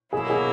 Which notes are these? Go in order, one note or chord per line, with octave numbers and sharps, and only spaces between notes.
B2 F#3 A#3 E4 G#4
G#4